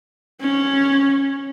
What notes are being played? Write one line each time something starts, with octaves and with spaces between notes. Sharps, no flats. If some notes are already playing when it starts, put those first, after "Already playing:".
C#4